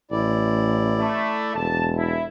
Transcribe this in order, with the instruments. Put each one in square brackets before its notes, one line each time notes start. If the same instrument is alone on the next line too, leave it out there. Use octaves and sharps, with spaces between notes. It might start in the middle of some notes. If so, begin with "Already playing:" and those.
[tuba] A1 [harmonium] E4 D5
[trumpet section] A3
[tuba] E1 [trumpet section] A5
[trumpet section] E4